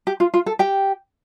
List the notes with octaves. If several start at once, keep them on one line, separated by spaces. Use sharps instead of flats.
G4
F4
F4
A4
G4 G5